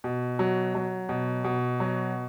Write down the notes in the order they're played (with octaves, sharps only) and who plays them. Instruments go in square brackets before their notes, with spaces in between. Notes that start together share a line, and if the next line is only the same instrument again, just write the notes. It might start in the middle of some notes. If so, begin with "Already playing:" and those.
[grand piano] B2
F#3
F#3
B2
B2
F#3